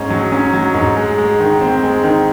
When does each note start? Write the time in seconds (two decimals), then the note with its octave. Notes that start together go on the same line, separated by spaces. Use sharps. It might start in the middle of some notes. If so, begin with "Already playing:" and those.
Already playing: G#2 C#4
0.10 F#3
0.32 C#4
0.53 F#3
0.74 G#2
0.96 G#3
1.18 G#3
1.40 D#3
1.61 C4
1.83 G#3
2.03 D#3